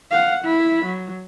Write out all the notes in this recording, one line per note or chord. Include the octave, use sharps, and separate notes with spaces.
F5 F#5
E4 B5
F#3